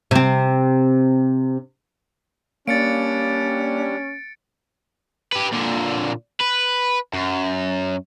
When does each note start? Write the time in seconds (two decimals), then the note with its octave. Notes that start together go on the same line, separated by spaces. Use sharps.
0.11 C3 C4
2.68 G3 A#3 C#4 D4 A6 C#7 D7
5.32 G4 B4
5.52 A#2 D3
6.40 B4
7.13 F#2